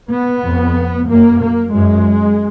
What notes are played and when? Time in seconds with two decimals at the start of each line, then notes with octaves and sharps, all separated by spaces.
0.11 B3
0.44 F2
1.08 F#2 A#3
1.41 A#3
1.74 F#2 G#3